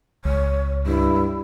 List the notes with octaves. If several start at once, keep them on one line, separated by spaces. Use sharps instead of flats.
C#2 C#5
G2 E4